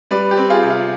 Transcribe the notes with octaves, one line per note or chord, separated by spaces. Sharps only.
G3 B4 D5
G4
C4
F4 G#4
C3
F4